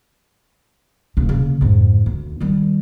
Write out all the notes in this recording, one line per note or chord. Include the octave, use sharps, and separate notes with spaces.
F#1 B2
C#3 A#3
F2 G#2
D2
D#3 G3